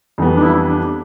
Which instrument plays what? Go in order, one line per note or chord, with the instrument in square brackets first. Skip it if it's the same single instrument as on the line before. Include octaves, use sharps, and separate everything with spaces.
[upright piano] F2 E3 G3 B3
[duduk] D4
E4
D4